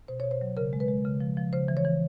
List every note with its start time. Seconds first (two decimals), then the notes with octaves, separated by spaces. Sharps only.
0.08 B2 C5
0.20 B2 C#5
0.31 C5
0.41 F#3
0.57 C#3 A#4
0.73 G#3
0.80 B4
0.88 G#3
1.05 C#3
1.20 F3
1.37 F3
1.53 C#3 C5
1.68 E3
1.77 C#5
1.85 E3